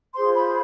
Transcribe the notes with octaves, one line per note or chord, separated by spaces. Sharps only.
F4 G#4 C5 C6
B5